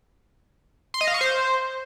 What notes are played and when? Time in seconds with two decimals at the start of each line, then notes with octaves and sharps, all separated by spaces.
0.94 C6
1.01 D#5
1.07 F5
1.14 C#6
1.21 C5